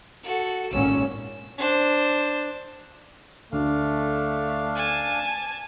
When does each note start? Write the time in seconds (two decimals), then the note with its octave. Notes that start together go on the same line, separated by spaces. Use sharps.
0.23 F#4 A4
0.72 G#1 A#2 C#4 E6
1.58 D4 C5
3.52 D2 A3 D4 F5
4.75 G#5 A5